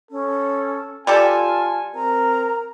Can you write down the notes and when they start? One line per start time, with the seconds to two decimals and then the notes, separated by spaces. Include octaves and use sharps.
0.11 C#4 A4
1.07 G3 F4 G4 A4 G#5 A5
1.95 C4 A#4 A#5